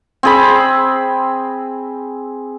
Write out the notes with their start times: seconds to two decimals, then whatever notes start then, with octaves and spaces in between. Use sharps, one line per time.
0.23 C4 G#4 B5